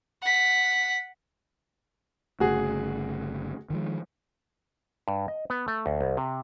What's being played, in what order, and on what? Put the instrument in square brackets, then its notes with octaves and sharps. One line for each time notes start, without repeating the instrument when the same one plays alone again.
[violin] F#5 B6
[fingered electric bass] G1 C#3 A3 [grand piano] F#4 G#4
[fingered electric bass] D#3 F3 G#3
[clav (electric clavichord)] G2
D#5
B3
A3
D2
C2
C3